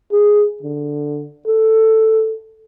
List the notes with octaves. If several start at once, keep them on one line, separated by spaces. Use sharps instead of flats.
G#4
D3
A4